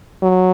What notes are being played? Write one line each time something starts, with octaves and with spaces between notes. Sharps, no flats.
F#3